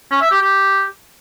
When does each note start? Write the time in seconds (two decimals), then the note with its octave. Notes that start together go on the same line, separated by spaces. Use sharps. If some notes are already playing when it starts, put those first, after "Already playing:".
0.11 C#4
0.21 E5
0.31 G4
0.41 G4